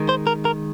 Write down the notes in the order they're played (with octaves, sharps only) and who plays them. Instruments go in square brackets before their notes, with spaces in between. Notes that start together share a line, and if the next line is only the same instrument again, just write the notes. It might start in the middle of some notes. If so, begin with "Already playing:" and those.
Already playing: [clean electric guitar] D#3 G#3
C5
A#4
A#4